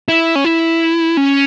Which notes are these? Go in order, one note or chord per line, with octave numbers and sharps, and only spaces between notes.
E4
C#4
E4
C#4